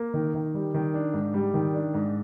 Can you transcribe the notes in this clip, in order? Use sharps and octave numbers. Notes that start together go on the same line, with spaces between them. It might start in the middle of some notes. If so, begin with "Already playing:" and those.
Already playing: A#3
D#3
D#3
G3
D#3
D4
G#2
G3
D#3
D4
G#2